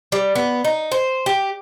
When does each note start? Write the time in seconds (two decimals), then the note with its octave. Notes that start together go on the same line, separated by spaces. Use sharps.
0.12 G3
0.36 B3
0.65 D#4
0.92 C5
1.26 G4